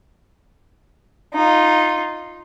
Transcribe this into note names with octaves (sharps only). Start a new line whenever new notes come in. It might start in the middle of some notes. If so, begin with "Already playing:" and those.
D#4 F4